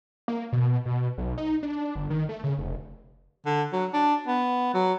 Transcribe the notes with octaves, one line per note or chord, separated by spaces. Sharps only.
A#3
B2
B2
B1
D#4
D4
G1
D#3
A3
C#3
F1
D3
F#3
D4
B3
F#3